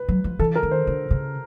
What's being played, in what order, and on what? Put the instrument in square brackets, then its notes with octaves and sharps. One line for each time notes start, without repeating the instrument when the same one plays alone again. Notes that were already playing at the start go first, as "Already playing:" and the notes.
Already playing: [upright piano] B4
[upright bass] F#3
F3
[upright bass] E3 [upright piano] A4
[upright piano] A#4
[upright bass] D#3
[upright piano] C5
[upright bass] D3
C#3